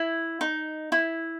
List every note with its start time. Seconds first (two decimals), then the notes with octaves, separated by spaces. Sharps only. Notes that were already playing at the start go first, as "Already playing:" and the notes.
Already playing: E4
0.41 D#4
0.92 E4